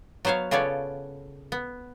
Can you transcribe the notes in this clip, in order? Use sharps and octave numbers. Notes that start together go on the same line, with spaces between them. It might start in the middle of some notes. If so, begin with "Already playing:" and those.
F#3 B3 C5 C#5 F5
C#3 B3 F4 A4 C#5 D5
B3